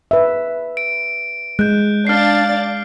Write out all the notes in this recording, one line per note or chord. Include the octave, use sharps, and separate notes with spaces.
B4 E5
D7
G#3 F#6 G6
D4 F5 F6 A6 C7